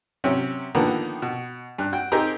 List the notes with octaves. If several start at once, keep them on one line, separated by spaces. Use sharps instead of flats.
C3 F#3 C#4
D3 D#3 F3 A#3 B3
B2
G2 F#6
F#4 G5
C4 D#4 G4 G#4 A#4